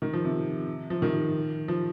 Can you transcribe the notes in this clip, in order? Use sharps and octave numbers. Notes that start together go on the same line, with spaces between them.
D#3
F3
C3
F3
D#3
F3